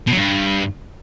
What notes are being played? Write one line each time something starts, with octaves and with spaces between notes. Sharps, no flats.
B2
F#3
G2